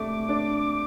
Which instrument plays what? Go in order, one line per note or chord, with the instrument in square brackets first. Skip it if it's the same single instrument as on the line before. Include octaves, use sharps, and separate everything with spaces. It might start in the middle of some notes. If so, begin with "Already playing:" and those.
Already playing: [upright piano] C3 A3 D4 [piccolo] D6
[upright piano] D4